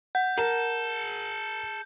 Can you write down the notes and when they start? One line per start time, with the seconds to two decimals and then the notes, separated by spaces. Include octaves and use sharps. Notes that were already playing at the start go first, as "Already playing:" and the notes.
0.15 F#5 G6
0.38 G#4 A#4 A5